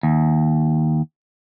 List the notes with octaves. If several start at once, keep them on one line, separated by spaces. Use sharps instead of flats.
D#2